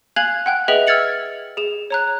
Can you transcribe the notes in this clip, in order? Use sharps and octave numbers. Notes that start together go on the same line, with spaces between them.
F5 G#5 F#6 G#6 F7 F#7
F#5 G5 F#6
G#4 B4 D#5 E5 G5 F#7
E6 F6 G#6 A6 C#7 F#7
G#4 E7
C#5 A#5 F#6